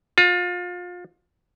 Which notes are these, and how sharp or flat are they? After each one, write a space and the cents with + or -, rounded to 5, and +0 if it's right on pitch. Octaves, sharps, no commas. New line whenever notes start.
F4 +30